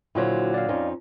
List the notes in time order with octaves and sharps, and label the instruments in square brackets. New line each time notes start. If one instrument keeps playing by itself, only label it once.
[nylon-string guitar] A#2 D3 F#3 [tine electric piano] E4 F#4 C5
[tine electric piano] D5 F5
[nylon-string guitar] F2 C#4 D#4